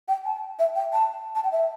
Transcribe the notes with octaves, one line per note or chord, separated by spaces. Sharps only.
G5
A5
E5
G5
A5
A5
G5
E5